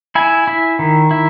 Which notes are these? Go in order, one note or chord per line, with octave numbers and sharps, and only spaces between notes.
E4 G#5
E4
D#3
E4